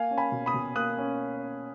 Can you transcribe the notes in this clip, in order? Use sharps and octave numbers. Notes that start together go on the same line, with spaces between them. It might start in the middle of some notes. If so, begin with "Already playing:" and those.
Already playing: A#3 F5 G#5
C#4
G#5 B5
B2
B5 D#6
B2
A#3 D#6 F#6
C#4